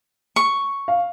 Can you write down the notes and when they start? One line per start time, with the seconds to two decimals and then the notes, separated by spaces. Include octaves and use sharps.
0.36 C#6
0.88 F5